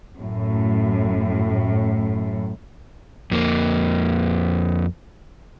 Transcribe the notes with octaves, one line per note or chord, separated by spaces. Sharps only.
F#2 A2
F2 A#3